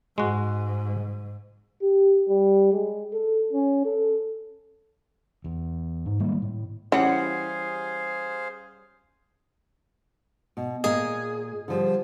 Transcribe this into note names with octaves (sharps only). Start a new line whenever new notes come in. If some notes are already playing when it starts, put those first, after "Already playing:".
G#2 G#3 F#4
G4
G3
G#3
A4
C#4
A4
E2
G#2
D#3 G3 G#3 A#3
A2
E3 G3 C#4 G4 G#4 C5 F5 F#5
B2
A#2 G#4 A#4 D#5
D3 F3 G3